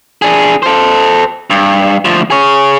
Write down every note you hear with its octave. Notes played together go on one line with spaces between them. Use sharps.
D4 G#4
A4 C5
G2
D2 F3
G#4 C#5